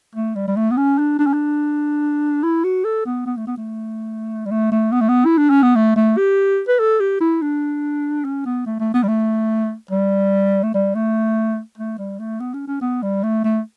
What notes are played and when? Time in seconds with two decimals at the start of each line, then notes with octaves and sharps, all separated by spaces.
0.15 A3
0.35 G3
0.48 G3
0.56 A3
0.70 B3
0.77 C#4
0.98 D4
1.19 D4
1.26 C#4
1.33 D4
2.43 E4
2.64 F#4
2.84 A4
3.06 B3
3.26 B3
3.37 A3
3.47 B3
3.57 A3
4.46 G3
4.51 A3
4.72 A3
4.92 B3
5.01 A3
5.09 B3
5.25 E4
5.37 D4
5.50 C#4
5.62 B3
5.75 A3
5.96 A3
6.17 G4
6.68 B4
6.79 A4
7.00 G4
7.20 E4
7.41 D4
8.25 C#4
8.46 B3
8.66 A3
8.80 A3
8.94 B3
9.03 G3
9.08 A3
9.91 G3
10.63 A3
10.74 G3
10.95 A3
11.78 A3
11.98 G3
12.19 A3
12.40 B3
12.54 C#4
12.68 C#4
12.81 B3
13.02 G3
13.23 A3
13.44 A3